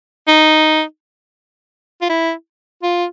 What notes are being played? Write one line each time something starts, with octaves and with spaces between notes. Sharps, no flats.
D#4
F4
E4
F4